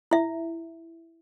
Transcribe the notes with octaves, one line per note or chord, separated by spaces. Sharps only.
E4 E5